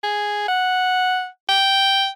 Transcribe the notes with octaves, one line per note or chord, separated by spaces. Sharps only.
G#4
F#5
G5